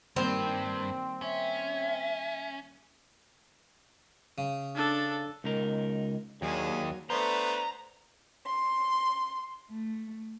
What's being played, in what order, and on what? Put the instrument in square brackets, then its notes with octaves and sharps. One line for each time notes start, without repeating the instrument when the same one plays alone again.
[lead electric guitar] G2 [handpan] D#3 G3 A#3 [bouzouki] C4
[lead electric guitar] C#4 [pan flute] E5
[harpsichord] C#3
[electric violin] D4 A4
[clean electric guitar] C#2 D#4 A#4
[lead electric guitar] D#2 [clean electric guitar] F#3 [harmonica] D4 G#4
[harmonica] A3 B3 D4 [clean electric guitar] C5 [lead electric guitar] A#5
[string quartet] C6
A3